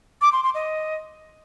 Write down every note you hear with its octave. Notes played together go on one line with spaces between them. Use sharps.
D6
C6
C6
D#5